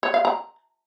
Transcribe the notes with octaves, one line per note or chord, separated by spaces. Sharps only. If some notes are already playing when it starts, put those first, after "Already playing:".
C#5
F5
A#5